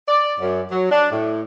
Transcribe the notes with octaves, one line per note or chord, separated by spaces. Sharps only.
D5
F#2
F#3
D4
A2